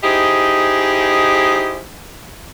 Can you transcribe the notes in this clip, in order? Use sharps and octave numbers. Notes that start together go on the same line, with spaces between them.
D#4 E4 G4 G#4 C5 D#5